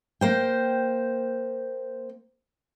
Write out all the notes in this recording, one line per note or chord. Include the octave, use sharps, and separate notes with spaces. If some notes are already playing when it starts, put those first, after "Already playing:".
A#3 C5 G5